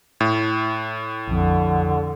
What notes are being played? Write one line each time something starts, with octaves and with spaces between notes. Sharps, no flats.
A2
A#1 F2 D3